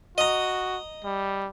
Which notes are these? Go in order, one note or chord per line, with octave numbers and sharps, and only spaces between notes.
F#4 D#5 A#5
G3